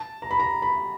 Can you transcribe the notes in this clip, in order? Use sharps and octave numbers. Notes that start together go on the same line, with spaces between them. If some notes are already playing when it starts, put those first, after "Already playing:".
Already playing: A5
A#5
B5
A#5
B5